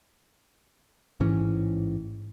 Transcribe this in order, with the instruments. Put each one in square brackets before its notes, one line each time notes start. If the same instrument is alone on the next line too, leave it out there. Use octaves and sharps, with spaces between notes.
[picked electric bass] A1 G#2 E3 C#4